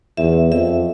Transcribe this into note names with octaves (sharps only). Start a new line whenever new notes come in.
E2 E5
F2 E5